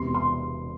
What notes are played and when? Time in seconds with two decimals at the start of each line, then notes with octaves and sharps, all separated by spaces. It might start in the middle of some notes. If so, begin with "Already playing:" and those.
Already playing: E1 E2 C3 C6
0.14 C6